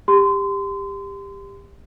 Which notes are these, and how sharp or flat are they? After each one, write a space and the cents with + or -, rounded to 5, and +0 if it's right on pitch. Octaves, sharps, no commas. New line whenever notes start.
G4 +20 C6 -30